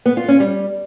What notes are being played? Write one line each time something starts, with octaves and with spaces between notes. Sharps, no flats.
B3
F4
C#4
G3